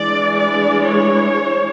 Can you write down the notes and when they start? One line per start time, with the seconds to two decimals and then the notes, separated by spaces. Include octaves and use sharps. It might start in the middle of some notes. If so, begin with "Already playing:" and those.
Already playing: E3 G#3 D4 D5
0.34 D5
0.84 C#5